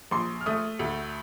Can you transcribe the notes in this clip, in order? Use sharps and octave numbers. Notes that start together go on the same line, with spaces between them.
A#1 C6
F6
A3 D#6
D2